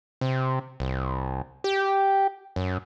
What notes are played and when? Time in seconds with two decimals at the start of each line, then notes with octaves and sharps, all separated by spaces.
0.21 C3
0.80 C2
1.64 G4
2.56 F#2